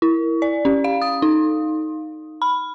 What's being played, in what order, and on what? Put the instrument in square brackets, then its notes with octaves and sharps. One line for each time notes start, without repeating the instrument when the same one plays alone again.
[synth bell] E4
D5
C#4
F5
D#6
D#4
B5